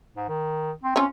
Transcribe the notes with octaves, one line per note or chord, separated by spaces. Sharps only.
G#2
D#3
C4
C4 C#4 F4 C#5